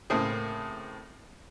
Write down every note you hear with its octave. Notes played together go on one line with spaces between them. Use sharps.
A2 C#3 A#3 C4 G#4